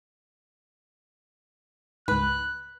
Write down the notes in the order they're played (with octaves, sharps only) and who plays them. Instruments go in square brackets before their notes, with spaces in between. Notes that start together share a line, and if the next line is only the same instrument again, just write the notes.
[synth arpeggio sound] C#2 G#2 [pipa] B4 [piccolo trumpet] F#6